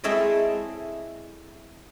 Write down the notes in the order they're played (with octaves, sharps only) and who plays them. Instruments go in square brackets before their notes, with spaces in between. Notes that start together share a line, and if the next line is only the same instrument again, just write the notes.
[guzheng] G#3 C4 E4 A4 C#5 D#5